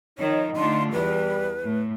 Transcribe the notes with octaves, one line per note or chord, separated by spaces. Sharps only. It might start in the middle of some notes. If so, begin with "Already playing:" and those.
D#3 F3 D#4 C#5
D3 A3 F4 C6
E2 E3 G3 B4
A2